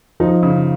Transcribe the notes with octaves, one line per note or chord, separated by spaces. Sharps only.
F3 D#4
C#3